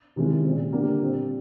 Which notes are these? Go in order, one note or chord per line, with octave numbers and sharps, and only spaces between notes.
C3 D#3 G#3 C#4 E4
A#2 G3 C4
D3 G3 A#3 D4
A#2 G3 C4